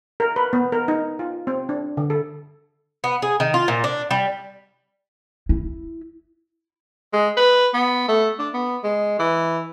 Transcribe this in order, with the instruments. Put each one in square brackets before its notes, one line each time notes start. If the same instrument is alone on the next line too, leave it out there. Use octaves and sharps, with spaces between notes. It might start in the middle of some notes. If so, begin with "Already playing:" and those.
[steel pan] A#4
B4
B3
A#4
D#4
F4
C4
D4
D3
A4
[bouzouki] B3
G#4
D#3
F4
A#2
D4
G3
[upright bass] E4
[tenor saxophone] G#3
B4
B3
A3
D4
B3
G#3
E3